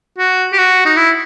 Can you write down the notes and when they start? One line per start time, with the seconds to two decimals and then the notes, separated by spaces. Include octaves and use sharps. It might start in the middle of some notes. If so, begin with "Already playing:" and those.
0.18 F#4
0.53 G4
0.58 F#4
0.85 D#4
0.97 E4